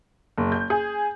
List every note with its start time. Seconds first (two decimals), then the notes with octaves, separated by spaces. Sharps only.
0.38 F#1
0.52 G6
0.70 G#4